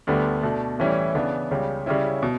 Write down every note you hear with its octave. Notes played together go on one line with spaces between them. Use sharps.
D2 D3 G3 B3 D4
B2 A3 D4
A2 E3 G3 C#4 E4
C#3 E3 B3 D4
C#2 C#3 G3
C#3 G3 C#4 E4
B2